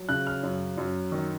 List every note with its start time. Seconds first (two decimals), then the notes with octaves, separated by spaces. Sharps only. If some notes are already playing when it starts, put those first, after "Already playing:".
Already playing: F#3
0.09 C#3 F#6
0.27 F6
0.43 F#2
0.78 F#2
1.12 D#3